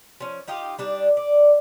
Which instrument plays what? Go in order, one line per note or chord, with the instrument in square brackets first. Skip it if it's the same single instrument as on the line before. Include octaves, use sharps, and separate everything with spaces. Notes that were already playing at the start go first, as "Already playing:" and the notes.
[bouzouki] F3 C#4
D#4 F4 G4 D#5
G3 D4 D#4
D5